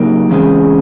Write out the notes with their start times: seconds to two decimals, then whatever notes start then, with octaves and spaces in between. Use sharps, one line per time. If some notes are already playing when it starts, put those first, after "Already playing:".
Already playing: C#3 F#3 A#3 D#4 G4
0.30 E2 C#3 G#3 C4